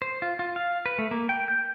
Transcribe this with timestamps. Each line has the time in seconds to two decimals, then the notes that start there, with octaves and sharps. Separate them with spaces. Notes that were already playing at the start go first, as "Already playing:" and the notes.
0.02 C5
0.22 F4
0.39 F4
0.56 F5
0.86 B4
0.99 A3
1.11 A#3
1.29 G5
1.48 G6